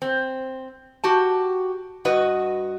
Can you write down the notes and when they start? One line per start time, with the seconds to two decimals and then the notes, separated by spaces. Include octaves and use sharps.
0.02 C4
1.04 F#4 G4 A5
2.05 G2 F#4 B4 D#5